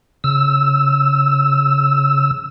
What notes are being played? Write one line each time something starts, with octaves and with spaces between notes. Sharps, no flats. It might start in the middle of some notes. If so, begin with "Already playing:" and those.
C#3 E6